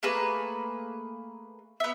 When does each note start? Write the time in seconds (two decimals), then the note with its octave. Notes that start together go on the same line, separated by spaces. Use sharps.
0.03 A3 A#3 G#4 B4
1.80 B3 E5